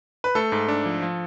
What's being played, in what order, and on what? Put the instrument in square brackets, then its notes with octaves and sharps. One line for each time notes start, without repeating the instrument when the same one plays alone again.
[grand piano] B4
[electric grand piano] A3 [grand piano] A4
[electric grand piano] G#2
D4
F3
F3